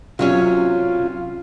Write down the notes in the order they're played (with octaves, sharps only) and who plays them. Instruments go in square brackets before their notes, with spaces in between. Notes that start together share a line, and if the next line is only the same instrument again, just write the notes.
[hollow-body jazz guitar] C3 F#3 C#4 [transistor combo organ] F4